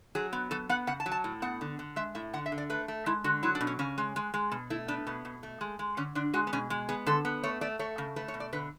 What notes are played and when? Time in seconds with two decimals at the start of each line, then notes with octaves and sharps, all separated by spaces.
0.15 F#3 G#4
0.33 B3
0.51 F#3 A4
0.69 B3 F#5
0.87 C#3 F#5
1.00 A5
1.06 F#3
1.12 A5
1.24 A2
1.42 B3 F#5
1.61 D3
1.79 D3
1.96 G#3 E5
2.15 A2 E5
2.33 D3 F#5
2.46 E5
2.52 D3
2.58 D5
2.70 A3 B4
2.88 A3
3.06 G#3 E4
3.24 D3 F#4
3.43 F#3 E4
3.55 D4
3.61 B2
3.67 C#4
3.79 C#3 C#4
3.98 G#3
4.16 G#3
4.34 G#3
4.51 B2
4.70 A3 E4
4.88 B3 D4
5.07 B2 B3
5.25 B2
5.43 A3
5.61 G#3
5.79 G#3
5.97 D3 C#4
6.15 D3 D4
6.34 G#3 F#4
6.47 B3
6.53 B2 C#4
6.70 G#3
6.89 B3 G#4
7.06 D3 A4
7.25 B3
7.43 A3 C#5
7.61 A3 D5
7.79 A3 C#5
7.98 C#3
8.16 A3 B4
8.28 C#5
8.34 B2
8.40 D5
8.53 D3 B4